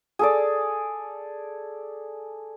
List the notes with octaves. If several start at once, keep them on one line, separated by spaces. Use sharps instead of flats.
G#4 A4 D5